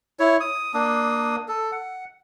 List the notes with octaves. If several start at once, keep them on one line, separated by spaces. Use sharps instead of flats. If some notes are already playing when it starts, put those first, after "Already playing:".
E4 C#5
D#6
A#3 D4 D#6
A4
F#5